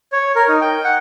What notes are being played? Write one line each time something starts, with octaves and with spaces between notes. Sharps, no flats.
C#5
A#4
D#4
G5
F#5